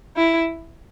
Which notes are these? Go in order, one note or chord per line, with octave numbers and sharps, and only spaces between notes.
E4